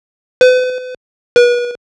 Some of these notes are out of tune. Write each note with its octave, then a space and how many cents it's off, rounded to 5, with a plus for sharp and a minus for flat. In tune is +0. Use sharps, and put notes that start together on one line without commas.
B4 +40
B4 -35